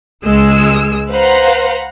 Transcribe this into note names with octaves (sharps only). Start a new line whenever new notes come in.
C#2 G#3 E6
B4 C5 F5 F#5 A#5